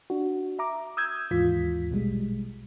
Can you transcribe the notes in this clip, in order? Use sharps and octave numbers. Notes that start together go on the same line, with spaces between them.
D4 F#4
E5 A#5 D6
D#6 E6 G6 G#6
D#2 G#2 E3 F4 B6
A#1 B2 G3 G#3